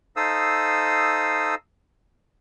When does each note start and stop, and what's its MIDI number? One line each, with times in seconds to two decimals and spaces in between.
0.16 1.55 63
0.16 1.55 69
0.16 1.55 72
0.16 1.55 77
0.16 1.55 87
0.16 1.55 88